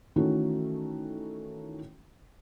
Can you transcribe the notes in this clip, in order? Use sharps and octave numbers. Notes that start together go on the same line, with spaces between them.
D#3 E3 A3 C#4 F#4